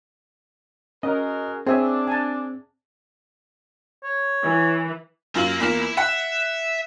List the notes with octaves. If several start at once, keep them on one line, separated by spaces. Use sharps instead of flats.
C#4 F#4 G#4 A#4 D#5
C4 D4 G#4 C#5 E5 G#5
G#5 A5
C#5
E3
F#2 A#3 F4 A#4 F#7
E2 A#3 E4 F4 B5
E5 F#5